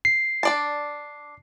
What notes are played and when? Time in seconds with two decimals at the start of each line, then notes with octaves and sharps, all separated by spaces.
0.05 C7
0.43 D4 D5 A5